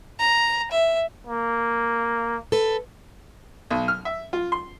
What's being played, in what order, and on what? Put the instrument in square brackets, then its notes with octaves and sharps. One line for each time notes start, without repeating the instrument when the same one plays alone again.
[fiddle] A#5
E5
[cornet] A#3
[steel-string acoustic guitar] A4 B4
[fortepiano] B1
F6
E5
F4
C6